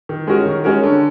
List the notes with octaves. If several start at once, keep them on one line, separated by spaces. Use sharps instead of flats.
D#3
G#3 C#4 F#4 A#4
D#3
G#3 C#4 F#4 A#4
D3